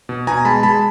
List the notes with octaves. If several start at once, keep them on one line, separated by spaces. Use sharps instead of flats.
B2
B2 G#5 A#5
G#3 A5 B5
G#3 A5 B5